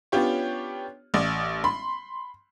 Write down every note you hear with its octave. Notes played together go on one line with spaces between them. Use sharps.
B3 C#4 D4 F4 G4 C#5
A1 D5 D#6
B5 C6